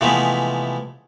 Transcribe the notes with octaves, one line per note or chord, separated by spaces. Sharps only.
C3 E3 F3 G#3 A3 B3